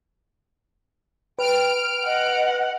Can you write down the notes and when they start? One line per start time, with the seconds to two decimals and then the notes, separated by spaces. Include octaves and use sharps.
1.39 B4 G5 F6 D7
2.06 D#5 F#5